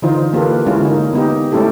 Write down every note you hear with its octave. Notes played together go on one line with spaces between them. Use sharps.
D3 E3 D#4 F4 C5
A#3 F4 G4 A4 B4
G#3 C#4 E4 F4
D3 A#3 D#4
B3 D#4 G4
G#3 A3 C#4 E4 G4 A4